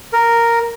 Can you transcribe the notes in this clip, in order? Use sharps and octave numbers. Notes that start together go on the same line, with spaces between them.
A#4